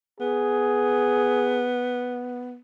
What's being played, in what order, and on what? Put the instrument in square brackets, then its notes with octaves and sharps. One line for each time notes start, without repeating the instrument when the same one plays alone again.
[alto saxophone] B3 [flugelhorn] G#4